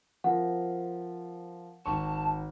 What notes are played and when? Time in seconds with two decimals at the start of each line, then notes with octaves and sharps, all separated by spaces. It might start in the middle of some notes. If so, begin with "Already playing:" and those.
0.24 F3 C4 A#4 F#5
1.86 G#1 A5 C#6